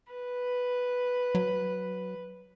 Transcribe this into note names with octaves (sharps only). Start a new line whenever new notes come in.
B4
F#3